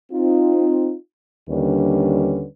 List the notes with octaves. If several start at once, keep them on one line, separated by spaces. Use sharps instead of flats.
C4 D#4 F4
D#2 D3 G3 C#4 D4 B4